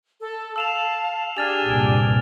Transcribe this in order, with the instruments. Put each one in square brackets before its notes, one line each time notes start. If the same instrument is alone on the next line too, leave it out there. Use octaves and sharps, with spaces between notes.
[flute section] A4
[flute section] F5 A5 [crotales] E6 E7 F7
[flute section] D4 [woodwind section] G4 G#4 G#5 [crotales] F6 A6 F7
[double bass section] C2 G2 A#2